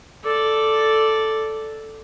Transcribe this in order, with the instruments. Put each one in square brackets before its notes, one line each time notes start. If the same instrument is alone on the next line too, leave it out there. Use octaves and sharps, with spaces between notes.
[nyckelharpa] A4 D5